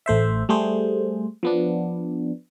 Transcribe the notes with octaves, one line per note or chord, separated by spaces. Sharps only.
A1 A3 C5 E5
G3 A3 G#4 C5
F3 B3 D4